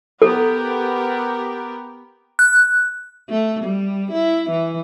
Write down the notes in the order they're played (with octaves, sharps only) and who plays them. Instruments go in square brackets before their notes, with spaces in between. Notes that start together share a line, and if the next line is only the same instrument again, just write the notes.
[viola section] B3 G4 A#4 [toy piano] A4
[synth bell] F#6
[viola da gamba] A3
G3
E4
E3